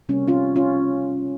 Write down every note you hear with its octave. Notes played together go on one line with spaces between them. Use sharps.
C3 G3 A#3 C#4
C#4 F4
C#4 F4